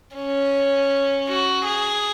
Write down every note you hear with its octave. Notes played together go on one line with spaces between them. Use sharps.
C#4
F#4
G#4